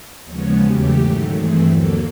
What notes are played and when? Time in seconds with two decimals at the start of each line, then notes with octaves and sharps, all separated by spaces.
0.25 D#2 C#3 F3 G#3 B3 C#5
0.60 E2 C#3 F#3 A3 G4
0.95 G#2 D#3 F#3 A3
1.30 G2 E3 A3 C4 G#4
1.65 D#2 D3 F#3 A#3 A4